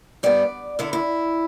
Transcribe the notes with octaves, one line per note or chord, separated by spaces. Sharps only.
G2 G3 B3 D5
E2 D3 B3 E4
E4